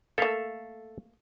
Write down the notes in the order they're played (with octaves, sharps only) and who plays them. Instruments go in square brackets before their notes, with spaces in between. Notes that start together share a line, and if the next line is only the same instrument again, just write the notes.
[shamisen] A3 A#3 [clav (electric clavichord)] A4 E5 F5